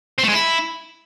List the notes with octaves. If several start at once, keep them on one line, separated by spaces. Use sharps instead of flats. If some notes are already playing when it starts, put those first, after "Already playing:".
C4
A3
G#3
E4